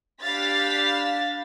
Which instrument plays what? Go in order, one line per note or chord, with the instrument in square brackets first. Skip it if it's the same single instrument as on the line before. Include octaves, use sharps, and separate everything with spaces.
[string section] D4 G4 F5 B5 A6 B6